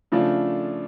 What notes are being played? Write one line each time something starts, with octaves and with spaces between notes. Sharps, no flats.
C#3 F3 A3 D4 F4